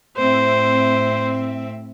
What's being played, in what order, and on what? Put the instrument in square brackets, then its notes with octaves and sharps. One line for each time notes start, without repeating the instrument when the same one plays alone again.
[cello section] A2 C4 E5 [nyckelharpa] C5